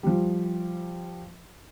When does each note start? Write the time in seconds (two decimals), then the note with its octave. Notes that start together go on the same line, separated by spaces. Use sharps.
0.03 F3 G3